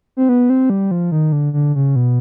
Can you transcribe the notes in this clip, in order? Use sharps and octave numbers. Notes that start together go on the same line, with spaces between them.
C4
B3
C4
G3
F3
D#3
D3
D3
C#3
B2